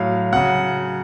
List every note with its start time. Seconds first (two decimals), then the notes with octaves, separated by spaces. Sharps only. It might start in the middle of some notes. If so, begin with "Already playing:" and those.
Already playing: A2 F#3 F5
0.33 C#3 F#3 F#5